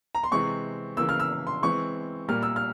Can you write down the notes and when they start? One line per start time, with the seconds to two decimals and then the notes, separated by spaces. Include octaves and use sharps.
0.15 A#5
0.24 C6
0.31 C3 E3 G#3 C4 C#6
0.97 C#3 E3 A#3 E6
1.09 F6
1.20 E6
1.47 C6
1.63 E3 G#3 C4 C#6
2.28 A#2 G3 A#3 F6
2.42 E6
2.56 F6